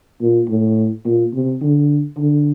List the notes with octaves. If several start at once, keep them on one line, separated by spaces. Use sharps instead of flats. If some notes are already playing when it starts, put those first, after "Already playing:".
A#2
A2
A#2
C3
D3
D3